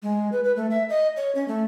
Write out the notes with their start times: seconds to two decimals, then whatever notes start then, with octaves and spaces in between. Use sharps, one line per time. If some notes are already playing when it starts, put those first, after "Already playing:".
0.03 G#3
0.32 B4
0.44 B4
0.56 A3
0.70 E5
0.89 D#5
1.16 C#5
1.35 C#4
1.48 A3